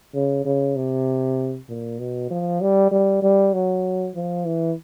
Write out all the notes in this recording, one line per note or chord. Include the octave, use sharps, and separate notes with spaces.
C#3
C#3
C3
A#2
B2
F3
G3
G3
G3
F#3
F3
E3